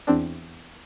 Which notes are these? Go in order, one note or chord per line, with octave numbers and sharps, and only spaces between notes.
E2 C4 D4